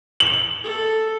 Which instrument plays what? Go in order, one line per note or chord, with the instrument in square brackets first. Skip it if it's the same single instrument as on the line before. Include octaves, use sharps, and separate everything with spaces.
[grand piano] F#7
[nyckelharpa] A4